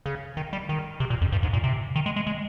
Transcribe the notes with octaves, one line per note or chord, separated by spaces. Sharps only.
C#3
D#3
G3
D#3
C3
A#2
F2
G2
G#2
A#2
C3
D#3
G#3
G#3
G#3